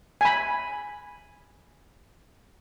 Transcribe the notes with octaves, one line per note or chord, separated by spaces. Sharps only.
G#5 B5